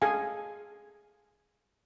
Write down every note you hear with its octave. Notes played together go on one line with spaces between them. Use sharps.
G#4 A4 F5 G#5